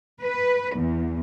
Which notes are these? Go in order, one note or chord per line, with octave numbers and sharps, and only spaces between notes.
B4
E2